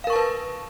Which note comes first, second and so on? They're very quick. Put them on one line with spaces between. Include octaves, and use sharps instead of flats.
F5 A#4 C#6 A5 B4